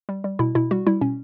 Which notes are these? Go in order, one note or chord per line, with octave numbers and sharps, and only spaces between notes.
G3
G3
B2 E4
B2 E4
G3 F#4
G3 E4
B2 C#4